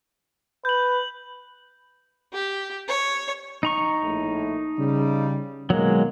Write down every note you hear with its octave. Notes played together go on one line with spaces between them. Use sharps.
B4 G6 F#7
G4
C#5
D#4 A#5 C#6
A#1 A2
C#3 G3
B2 D#3 F#3 G#3 A#3